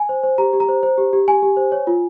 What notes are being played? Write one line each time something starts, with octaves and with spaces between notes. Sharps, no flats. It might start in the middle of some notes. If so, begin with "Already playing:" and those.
Already playing: G#5
C5
C5
G4 A#5
G4
A#5
C5
C5
G4
G4
G4 G#5
G4
C5
C#5
F4